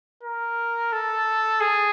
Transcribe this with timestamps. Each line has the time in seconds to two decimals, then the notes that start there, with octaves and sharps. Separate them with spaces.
0.24 A#4
0.92 A4
1.61 G#4